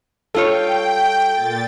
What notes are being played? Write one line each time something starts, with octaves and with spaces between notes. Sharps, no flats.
G3 F4 A4 C#5 G5
A#2 A6